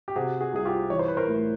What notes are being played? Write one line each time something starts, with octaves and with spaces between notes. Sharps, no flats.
G4
C3 F#4 G#4
F#4 G#4
C2 G#4
F4 G4
E3 C#5
C5
B4
A#4 C5
A2